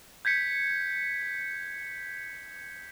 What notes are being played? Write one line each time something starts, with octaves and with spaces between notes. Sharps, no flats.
G6 G#6 B6 C#7